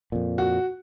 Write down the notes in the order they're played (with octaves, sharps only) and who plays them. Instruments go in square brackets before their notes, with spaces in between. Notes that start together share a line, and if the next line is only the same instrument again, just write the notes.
[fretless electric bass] F2 A#2
[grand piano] F#4